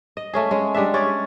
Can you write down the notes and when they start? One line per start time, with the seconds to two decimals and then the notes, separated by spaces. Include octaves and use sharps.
0.17 D#5
0.33 A3 C#4 G#4
0.51 G#3 C#4
0.74 G3 G#3 D4 E5
0.94 C#4 C#5 D5